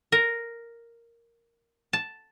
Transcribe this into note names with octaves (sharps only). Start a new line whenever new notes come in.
A#4
A5